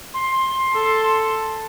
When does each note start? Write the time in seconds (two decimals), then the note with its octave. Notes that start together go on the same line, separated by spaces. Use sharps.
0.14 C6
0.71 A4